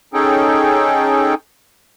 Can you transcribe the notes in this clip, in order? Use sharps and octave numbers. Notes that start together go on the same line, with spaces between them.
C#4 D#4 G#4 A4 G5